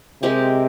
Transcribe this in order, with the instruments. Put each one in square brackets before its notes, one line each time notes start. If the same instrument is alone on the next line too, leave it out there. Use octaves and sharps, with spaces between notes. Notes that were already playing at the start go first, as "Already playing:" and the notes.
[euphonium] C3 [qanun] G#3 C4 G4 A#4